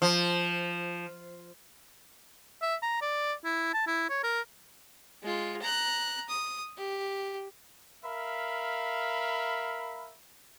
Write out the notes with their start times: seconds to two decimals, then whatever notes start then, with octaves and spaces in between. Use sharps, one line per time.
0.02 F3
2.62 E5
2.82 A#5
3.01 D5
3.44 E4
3.74 A5
3.87 E4
4.10 C#5
4.23 A#4
5.23 G#3 F4
5.62 A#5 F#6
6.29 D#6
6.78 G4
8.05 A#4 E5 F5 B5